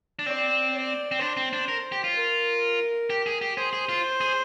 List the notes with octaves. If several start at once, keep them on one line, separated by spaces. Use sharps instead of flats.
D4
C4 D5
D5
C4
D4 C5
C4
D4
A#4
G4
F4
A#4
G4
G#4
G4
G#4 C5
G#4
F4
G#4